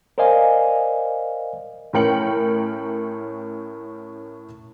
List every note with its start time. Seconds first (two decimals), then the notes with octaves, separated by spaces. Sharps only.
0.18 A#4 C5 D5 D#5 F5 G#5
1.93 A2 C#4 A#4 G5 C#7 F#7